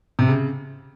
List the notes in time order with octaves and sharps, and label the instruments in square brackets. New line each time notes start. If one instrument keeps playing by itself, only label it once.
[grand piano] C3
C#3